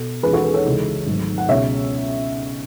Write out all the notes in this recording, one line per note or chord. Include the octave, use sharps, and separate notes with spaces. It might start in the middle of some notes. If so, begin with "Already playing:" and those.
Already playing: B2 A4
E2 D#3 G#3 C#4 G#4 B4
F#4 A4
G#4 B4
A4 C#5
C#2 C#3 E3 G#3 D#4
G#1 G#2 F#3 A3
F#5
C#2 B2 G#3 C#4 C#5 E5